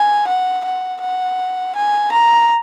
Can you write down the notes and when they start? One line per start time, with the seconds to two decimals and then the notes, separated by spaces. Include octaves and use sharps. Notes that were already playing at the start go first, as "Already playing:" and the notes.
Already playing: G#5
0.27 F#5
0.65 F#5
1.02 F#5
1.76 G#5
2.12 A#5